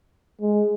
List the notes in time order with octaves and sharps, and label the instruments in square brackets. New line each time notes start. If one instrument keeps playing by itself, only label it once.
[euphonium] G#3